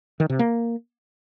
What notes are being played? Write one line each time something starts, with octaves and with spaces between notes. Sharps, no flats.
D#3
C3
A#3